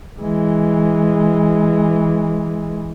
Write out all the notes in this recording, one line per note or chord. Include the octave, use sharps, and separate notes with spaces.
E3 G#3